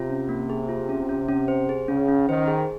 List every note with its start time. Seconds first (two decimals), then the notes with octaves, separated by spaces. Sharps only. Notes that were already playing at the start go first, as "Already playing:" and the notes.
Already playing: C3 F4
0.10 C#4
0.29 A#3
0.50 G#4
0.69 F4
0.89 C#4
1.09 C#4
1.28 C#4
1.48 C5
1.69 G#4
1.88 C#3 C#4
2.09 C#4
2.29 D#3 C5
2.48 G#4